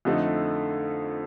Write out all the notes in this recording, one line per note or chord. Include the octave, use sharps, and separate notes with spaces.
F2 D3 A3 D#4 A4